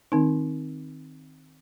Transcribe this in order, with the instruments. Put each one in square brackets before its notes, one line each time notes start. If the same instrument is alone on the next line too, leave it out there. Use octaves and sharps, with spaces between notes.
[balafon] D#3 C4 D#4